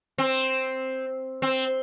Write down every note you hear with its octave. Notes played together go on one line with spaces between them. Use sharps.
C4
C4